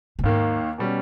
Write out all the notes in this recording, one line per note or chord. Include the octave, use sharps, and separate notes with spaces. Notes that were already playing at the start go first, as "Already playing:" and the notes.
A#2
D#2 G#2 D#3 A#3
B2 G3 C#4